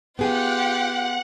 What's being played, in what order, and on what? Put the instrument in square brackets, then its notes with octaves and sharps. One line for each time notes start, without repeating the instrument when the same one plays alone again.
[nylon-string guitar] B3 G#4 [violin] F4 G4 [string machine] F#5